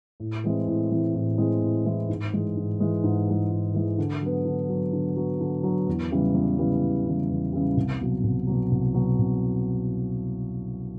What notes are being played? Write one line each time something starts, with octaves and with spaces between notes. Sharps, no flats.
A2
E3 G#3 C4 E4
A2
E3 G#3 C4 E4
A2
E3 G#3 C4 E4
A2
E3 G#3 C4 E4
G#2
E3 G#3
G#2
E3 G#3
G#2
E3 G#3
G#2
E3 G#3
D3
F#3 B3
D3
F#3 B3
D3
F#3 B3
D3
F#3 B3
E2
C#3 E3 G3
E2
C#3 E3 G3
E2
C#3 E3 G3
E2
C#3 E3 G3
C2
B2 F#3
C2
B2 F#3
C2
B2 F#3
C2